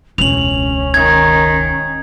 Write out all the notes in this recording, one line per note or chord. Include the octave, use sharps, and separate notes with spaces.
E1 C#2 C#4 F7 F#7
D#3 G#6